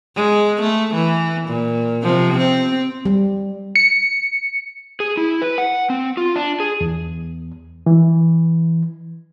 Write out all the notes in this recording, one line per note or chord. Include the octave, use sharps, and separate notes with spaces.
G#3
A3
E3
A#2
C3 F3
C4
G3
C#7
G#4
E4
B4
F#5
C4
F4
D4
G#4
E2
E3